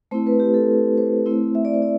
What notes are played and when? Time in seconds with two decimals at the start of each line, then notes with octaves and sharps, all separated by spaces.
0.11 A3 C4 E4 C5
0.27 B4
0.40 G4
0.54 A4
0.97 C5
1.26 A3 C4 E4
1.55 E5
1.65 D5
1.74 C5
1.82 D5